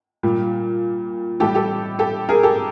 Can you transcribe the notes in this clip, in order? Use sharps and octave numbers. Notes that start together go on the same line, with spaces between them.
A#2 G3
A2 E3 G3 G4 A4
G4 A4
G4 A4
G#4 A#4
G4 A4